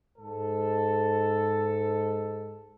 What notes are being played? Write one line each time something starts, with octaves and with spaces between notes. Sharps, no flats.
G#2 A4